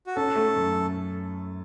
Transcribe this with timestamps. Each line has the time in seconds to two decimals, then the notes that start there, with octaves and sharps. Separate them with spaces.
0.07 F#4
0.16 C#4 A4
0.36 A3
0.56 F#2